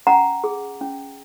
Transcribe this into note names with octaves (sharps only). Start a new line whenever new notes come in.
C#4 F#5 A#5
G#4
C#4